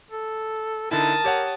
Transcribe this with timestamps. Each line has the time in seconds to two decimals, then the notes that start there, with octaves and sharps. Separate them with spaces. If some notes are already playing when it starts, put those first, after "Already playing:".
0.11 A4
0.91 D3 D#4 E4 A#4 A5 D#6
1.24 G4 C#5 F#5